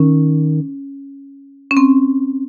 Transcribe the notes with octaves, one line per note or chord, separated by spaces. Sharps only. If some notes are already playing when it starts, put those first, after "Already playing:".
Already playing: D#3 C#4
C#4
C4